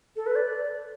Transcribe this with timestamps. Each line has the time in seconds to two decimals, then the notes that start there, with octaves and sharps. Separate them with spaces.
0.16 A4
0.26 B4
0.36 D5